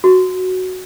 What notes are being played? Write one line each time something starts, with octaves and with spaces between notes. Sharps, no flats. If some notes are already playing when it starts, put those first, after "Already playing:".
F#4